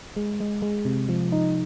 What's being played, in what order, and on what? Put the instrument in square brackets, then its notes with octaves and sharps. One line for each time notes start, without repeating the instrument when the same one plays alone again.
[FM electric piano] G#3
G#3
G#3
C3
F3
D#4